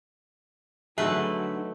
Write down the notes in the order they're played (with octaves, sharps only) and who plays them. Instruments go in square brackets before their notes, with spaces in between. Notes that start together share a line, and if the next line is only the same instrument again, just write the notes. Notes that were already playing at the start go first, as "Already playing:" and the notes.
[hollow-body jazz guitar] D3 D#4 G#4 [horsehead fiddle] F#3 [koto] A3 B4 [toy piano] E5